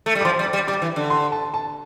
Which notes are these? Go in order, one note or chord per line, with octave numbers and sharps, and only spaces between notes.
A3
G3
D6
F3 C6
G3
D6
G3
G3 D6
E3
D3
C6
A5
A5